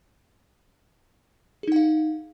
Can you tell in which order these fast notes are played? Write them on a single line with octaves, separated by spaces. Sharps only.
G#4 D#4 F#5 F5